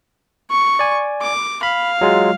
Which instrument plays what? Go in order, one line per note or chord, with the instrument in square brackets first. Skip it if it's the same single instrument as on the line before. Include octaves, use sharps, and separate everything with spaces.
[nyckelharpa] C#6
[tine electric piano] D5 G#5
[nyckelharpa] D6
[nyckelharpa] F5 [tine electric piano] B5
[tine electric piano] F#3 G#3 F4